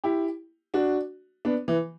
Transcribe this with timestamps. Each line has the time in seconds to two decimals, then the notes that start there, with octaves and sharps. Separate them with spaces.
0.04 E4 G4
0.74 D4 F#4
1.45 B3 D4
1.68 E3